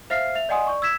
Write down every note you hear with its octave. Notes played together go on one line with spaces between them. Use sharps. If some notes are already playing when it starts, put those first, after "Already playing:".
C5 E5 F5 F6 C7
E5 F7
D5 D#5 F#5 G#5 C6 D#6
D5 C#6
E6 G#6 B6 E7